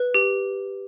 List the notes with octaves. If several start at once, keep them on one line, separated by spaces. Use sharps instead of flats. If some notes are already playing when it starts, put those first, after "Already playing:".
Already playing: B4
G4